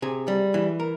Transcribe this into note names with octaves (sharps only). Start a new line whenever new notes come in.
C3 G#4
G3
E3
A#4